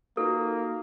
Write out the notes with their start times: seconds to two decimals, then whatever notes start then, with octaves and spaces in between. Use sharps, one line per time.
0.17 A#3 D#4 F4 F#4 A4